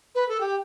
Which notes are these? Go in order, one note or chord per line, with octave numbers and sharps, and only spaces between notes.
B4
A4
G4